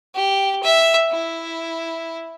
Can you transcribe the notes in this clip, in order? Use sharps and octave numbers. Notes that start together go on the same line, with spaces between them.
G4
E5
E4